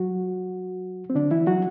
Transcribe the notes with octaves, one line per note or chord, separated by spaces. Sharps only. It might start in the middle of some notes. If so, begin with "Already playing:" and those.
Already playing: F#3 F#4
C4
D3 D4
E3 E4
F#3 F#4